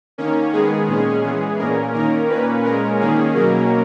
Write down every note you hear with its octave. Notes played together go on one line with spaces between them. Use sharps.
D#3 A#3 C#4
D#3 G#3 B3 G#4
A#2 G#3 C#4
E3 G#3 B3
A#2 A#3 C#4 A#4
D#3 A#3 C#4 A#4
A#2 A#3 C#4 B4
A#2 G#3 C#4 A#4
D#3 A#3 C#4 G#4
B2 F#3 A#3 C#4 A#4